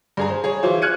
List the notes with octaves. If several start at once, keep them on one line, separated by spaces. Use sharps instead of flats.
G2 G#4 A#5
C5
G#4 C#5
E3 F#3 F4 C5
F6 F#6 G#6 C#7 D#7